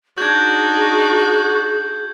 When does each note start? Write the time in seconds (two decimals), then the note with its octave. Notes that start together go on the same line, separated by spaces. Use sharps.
0.18 D4 D#4 F#4 G#4 G6 G#6